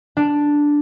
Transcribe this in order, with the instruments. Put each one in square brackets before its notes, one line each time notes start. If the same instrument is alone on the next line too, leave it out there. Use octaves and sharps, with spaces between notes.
[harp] D4